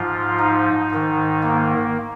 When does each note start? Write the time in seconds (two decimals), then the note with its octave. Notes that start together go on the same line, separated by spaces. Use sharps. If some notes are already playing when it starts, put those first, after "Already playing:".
Already playing: G#2 F3 F4
0.39 D#4
0.91 G#2 D#3
1.43 A#3